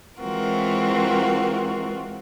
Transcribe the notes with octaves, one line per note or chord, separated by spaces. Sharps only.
E3 G#3 C4 F4 F#4 A#4